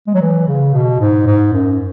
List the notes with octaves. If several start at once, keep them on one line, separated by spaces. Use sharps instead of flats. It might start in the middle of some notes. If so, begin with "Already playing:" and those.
G#3
F#3
E3
C#3
B2
G#2
G#2
F#2